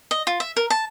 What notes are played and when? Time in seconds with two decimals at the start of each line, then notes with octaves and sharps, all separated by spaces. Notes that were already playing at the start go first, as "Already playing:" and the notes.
0.11 D#5
0.27 F4
0.40 E5
0.57 A#4
0.70 A5